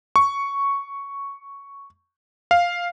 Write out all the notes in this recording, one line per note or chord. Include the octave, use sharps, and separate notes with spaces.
C#6
F5